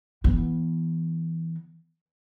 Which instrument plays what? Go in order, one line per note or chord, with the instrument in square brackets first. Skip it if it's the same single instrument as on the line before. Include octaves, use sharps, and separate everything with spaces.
[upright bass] E3 B3